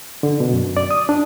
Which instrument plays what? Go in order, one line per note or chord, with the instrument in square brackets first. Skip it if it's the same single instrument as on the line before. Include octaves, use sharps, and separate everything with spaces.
[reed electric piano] D3
B2
F#2
D5
D#6
D4